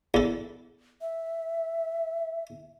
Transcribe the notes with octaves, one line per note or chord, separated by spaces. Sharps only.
E2 A4
E5